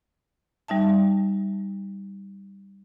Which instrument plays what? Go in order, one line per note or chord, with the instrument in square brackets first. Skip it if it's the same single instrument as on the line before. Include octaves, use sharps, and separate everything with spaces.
[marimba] G3 D#4 E5 A5